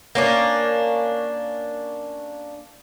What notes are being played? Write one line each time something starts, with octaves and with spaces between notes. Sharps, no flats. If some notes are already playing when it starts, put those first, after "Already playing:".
A#3 C#4 D4